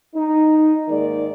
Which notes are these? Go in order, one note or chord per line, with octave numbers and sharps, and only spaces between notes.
D#4
G#2 D#3 G#3 A#3 A#4 D5